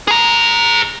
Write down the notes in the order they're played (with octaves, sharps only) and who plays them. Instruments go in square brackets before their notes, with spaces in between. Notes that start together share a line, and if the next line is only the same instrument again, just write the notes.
[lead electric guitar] G#4 A#5